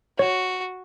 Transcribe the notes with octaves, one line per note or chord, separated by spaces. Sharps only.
F#4 C#5